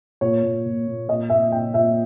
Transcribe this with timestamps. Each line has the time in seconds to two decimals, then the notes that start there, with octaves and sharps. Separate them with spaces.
0.21 A#2 C#5
0.43 A#2
0.66 A#2
0.87 A#2
1.08 A#2 D#5
1.30 A#2 E5
1.52 A#2 G5
1.74 A#2 E5